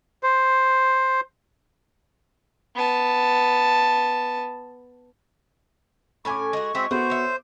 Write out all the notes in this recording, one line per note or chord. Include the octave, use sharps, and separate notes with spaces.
C5
B3 A5
A2 C#4 G#5 B5 C#6 D6
G#3 F#4
G#3 C4 F#4 E5
A3 B3 F#4 C5
C#5 E5